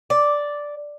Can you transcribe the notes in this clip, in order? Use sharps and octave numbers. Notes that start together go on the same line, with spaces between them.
D5